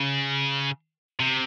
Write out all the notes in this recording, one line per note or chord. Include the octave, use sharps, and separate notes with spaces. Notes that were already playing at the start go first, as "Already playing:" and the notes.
Already playing: C#3
C3